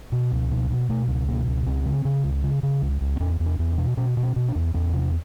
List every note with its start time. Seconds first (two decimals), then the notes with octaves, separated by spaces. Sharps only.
0.12 B2
0.32 C#2
0.51 B2
0.70 B2
0.89 B2 A3
1.08 C#2
1.28 B2 A#3
1.47 C#2
1.66 C#2 C4
1.86 C#3
2.05 C#3
2.24 C#2
2.43 C#3
2.63 C#3
2.82 C#2
3.01 C#2
3.16 C4
3.20 E2 C#4
3.40 E2
3.46 D4
3.59 E2
3.72 D4
3.78 B2
3.97 B2 C#4
4.17 B2
4.23 C#4
4.36 B2
4.48 D4
4.55 E2
4.74 E2 C#4
4.93 C3